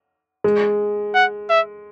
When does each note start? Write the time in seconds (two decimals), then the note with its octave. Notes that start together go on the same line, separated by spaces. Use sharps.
0.44 G#3
1.14 F#5
1.50 E5